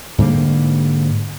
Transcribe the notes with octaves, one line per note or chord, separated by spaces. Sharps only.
G#2 D3 G3 A#3